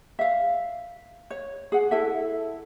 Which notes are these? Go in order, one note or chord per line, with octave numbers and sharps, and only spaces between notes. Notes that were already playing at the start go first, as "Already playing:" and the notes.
E5 F5
C#5
G#4 F#5
E4 A4 E5